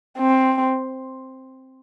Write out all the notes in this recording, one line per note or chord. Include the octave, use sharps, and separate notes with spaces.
C4